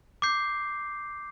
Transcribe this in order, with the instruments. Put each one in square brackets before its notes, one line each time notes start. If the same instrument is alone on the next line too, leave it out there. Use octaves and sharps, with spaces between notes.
[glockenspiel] D6 G6 C7